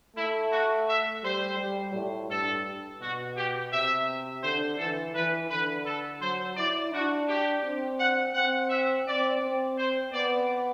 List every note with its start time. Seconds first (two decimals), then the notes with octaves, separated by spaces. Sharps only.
0.16 A3 E4
0.52 F#4
0.88 E5
1.23 G3 C5
1.59 G3
1.94 A2
2.30 G2 A4
3.01 B2 F#4
3.37 G4
3.72 C3 E5
4.43 D3 C5
4.78 E3 A4
5.15 E3 B4
5.49 D3 B4
5.86 A4
6.21 F#3 C5
6.57 E4 D5
6.93 D4 F#4
7.28 G4
7.64 C4
8.00 F#5
8.34 C4 F#5
8.70 E5
9.06 C4 D5
9.42 C4
9.78 C5
10.13 B3 D5